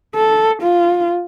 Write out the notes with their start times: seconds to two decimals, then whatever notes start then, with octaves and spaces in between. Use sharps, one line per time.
0.15 A4
0.63 F4